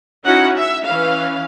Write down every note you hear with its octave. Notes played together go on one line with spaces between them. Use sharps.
C#4 D#4 E4 F#4 F#5
E5
E3 C#4 B4 F5